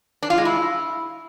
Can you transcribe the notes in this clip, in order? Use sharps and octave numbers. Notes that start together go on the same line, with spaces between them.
D4
F4
G#3
E4